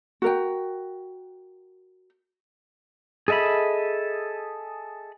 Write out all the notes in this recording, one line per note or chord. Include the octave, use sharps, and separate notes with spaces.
F#4 A#4 G5
G#4 A4 D#5 E5 B5